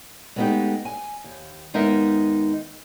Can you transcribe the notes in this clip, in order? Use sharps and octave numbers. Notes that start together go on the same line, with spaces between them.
G#3 A3 B3 C#4 D#4 G4
G#5
D#2
D#2 G#3 B3 D#4 A#4 E5